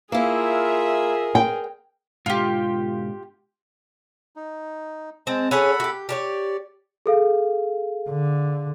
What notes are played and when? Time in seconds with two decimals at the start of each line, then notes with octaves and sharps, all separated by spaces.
0.12 A#3 E4 F4 G#4 A#4 E5
1.35 G5
2.26 G#2 B2 D3 F4 G4
4.36 D#4
5.27 G#3 C4 A5
5.51 C#4 G#4 A4 C#5 F#5 B5
5.80 F#4 G4
6.09 G4 A#4 C#5 D5
7.06 G#4 A4 F5
8.10 D3